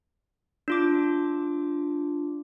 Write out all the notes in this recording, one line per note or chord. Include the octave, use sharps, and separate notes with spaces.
D4 F4 D6